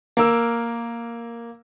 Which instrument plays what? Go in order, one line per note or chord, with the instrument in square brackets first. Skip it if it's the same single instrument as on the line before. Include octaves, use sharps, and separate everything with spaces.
[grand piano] A#3 A#4 E6